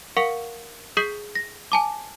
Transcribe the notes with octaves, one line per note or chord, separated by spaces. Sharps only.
A#4 F5 F#5 C#6 C#7
G#4 D#6 G6 B6 C7 F#7
A#6
G#5 A5 D6